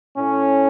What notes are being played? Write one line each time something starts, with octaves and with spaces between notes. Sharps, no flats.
A2 A3 C#4